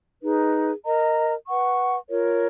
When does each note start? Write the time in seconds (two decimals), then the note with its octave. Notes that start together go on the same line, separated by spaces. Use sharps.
0.22 D#4 G#4 B4
0.85 A#4 D#5 A#5
1.47 B4 F#5 C#6
2.09 F4 A#4 C#5